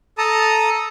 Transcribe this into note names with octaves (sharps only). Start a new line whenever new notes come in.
A4 A5 A#5 D#6